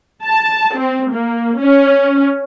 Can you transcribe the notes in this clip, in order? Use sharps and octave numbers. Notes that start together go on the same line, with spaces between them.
A5
C4
A#3
C#4